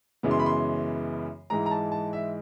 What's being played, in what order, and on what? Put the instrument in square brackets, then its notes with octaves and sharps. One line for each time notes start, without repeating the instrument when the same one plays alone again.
[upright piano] F#2 C#3 E3 G#3 B3
C6
B5
C6
G#2 E3 G#3 A#5
A#5
A5
A5
E5